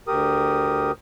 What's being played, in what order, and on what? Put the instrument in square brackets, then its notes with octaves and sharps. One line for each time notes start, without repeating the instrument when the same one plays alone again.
[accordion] D2 G4 A#4 D#6